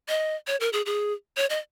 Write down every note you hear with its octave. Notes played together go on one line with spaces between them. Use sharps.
D#5
C#5
A#4
G#4
G#4
C#5
D#5